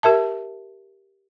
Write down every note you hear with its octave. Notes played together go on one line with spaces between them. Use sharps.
G4 A#4 E5 A5